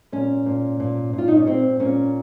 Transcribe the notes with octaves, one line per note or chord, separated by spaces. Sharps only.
A#2 C#4
A#2
A#2
A#2
F4
D#4
C#4
A#2 C4
A#2 C#4